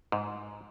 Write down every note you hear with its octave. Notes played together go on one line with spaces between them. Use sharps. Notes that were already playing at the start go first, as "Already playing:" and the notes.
G#2